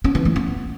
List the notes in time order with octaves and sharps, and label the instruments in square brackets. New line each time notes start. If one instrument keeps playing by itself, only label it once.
[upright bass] C#4
E3
A3
B3